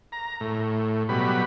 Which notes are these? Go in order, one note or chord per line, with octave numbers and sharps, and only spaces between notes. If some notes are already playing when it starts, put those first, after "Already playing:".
A#5
A2
B2 F#3 G3 B5